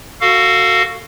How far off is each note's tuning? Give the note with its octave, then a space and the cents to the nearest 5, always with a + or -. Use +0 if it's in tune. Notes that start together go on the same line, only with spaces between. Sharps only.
F#4 +0 A4 +30 F5 +0